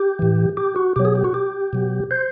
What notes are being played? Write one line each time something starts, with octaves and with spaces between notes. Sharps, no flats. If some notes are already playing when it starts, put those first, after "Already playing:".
Already playing: G4
A2 E3
G4
F#4
B2 F#3 G4
G#4
G4
F#4
G4
B2 F#3
C5